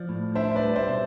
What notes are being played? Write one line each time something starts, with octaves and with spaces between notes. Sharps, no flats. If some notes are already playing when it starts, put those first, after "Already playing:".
Already playing: F3 D5
A2
D4 C5 E5
B4 D5
G3
C5 E5
B2